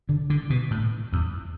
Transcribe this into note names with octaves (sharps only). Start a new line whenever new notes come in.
D3
D3
B2
A2
E2